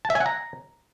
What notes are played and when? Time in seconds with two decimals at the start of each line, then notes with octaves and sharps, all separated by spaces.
0.05 A5
0.10 E5
0.15 G#5
0.21 F#5
0.26 A#5